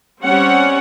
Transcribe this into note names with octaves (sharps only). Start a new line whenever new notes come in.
G3 C4 C#4 C#5 F#5